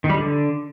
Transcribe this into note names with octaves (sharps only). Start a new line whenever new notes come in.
D#3
G3
D3